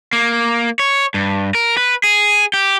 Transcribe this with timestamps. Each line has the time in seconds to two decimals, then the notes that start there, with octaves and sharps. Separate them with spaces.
0.13 A#3
0.79 C#5
1.14 G2
1.55 A#4
1.77 B4
2.03 G#4
2.53 G4